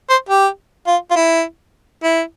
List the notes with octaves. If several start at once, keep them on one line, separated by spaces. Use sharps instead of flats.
C5
G4
F4
F4
E4
E4